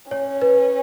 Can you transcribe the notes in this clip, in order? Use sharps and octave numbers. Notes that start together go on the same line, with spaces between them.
C#4 C#5
B4